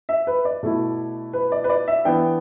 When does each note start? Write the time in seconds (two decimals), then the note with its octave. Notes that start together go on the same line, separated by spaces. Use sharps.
0.09 E5
0.27 B4
0.45 D5
0.63 B2 A3 E4
1.33 B4
1.52 D5
1.64 B4
1.69 D5
1.88 E5
2.05 E3 B3 D4 G5